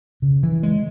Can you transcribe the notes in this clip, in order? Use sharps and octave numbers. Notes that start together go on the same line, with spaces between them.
C#3
E3
G#3